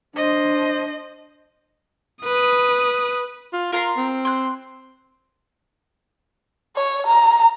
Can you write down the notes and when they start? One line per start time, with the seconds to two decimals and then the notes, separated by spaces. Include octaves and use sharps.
0.16 D4 C5 D#5
2.23 B4 D#6
3.53 F4
3.72 F4 A#4 A#5 C6
3.97 C4
4.25 C6 F#6
6.76 C#5
7.07 A#5